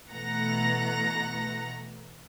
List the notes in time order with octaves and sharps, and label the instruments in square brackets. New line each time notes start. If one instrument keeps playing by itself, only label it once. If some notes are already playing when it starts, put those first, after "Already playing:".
[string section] B2 E3 A3 F#5 A#5 A#6